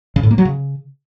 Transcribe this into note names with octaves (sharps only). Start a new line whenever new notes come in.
C#3
A2
A#3
F#3
C#3